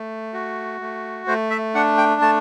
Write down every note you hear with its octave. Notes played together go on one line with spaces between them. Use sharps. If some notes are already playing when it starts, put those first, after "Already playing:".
Already playing: A3
F#4
A3
A3 C5
E5
D4 F#5
G5
A3 A5